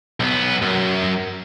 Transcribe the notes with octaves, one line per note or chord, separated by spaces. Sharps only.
B1 B3
F#2